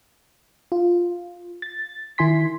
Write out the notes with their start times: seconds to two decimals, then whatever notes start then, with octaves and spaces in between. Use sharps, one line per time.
0.72 F4
1.62 A6
2.18 D#3 E4 G#5 C6 B6